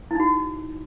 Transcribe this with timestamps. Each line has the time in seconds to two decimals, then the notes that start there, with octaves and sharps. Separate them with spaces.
0.11 E4
0.15 D#4
0.20 F#4